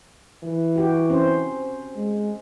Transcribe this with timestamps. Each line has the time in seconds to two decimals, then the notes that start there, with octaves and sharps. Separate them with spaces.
0.43 E3
0.76 F#4 G4
1.10 C4 C#4 C5
1.95 G#3